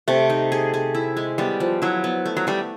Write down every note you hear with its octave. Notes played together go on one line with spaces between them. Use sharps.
C3 A3
D#4
G#4
G#4
E4
G#3
G3 B3
F3
F#3 E4
B3
A3
F#3
G3 A3